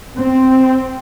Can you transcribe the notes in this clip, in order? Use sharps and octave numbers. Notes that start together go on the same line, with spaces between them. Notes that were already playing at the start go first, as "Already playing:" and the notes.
C4